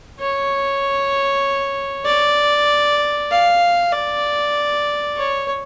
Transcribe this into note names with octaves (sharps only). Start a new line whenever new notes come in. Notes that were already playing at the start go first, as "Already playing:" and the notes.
C#5
D5
F5
D5
C#5